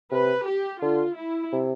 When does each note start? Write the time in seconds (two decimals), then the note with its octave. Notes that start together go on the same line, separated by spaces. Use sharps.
0.12 C3 B4
0.46 G4
0.82 D3 F4
1.17 E4
1.53 C3